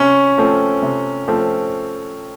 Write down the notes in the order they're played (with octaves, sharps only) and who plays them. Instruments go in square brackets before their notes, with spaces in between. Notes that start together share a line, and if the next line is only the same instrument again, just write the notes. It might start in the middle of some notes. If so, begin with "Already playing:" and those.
Already playing: [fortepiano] C3 [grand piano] C#4
[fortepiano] F3 A3 C4
C3
F3 A3 C4